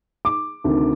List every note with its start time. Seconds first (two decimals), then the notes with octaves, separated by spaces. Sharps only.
0.25 D6
0.64 D2 C3 D#3